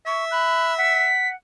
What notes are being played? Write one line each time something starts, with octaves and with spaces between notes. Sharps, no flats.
E5 C#6
B5 F#6
F#5 B6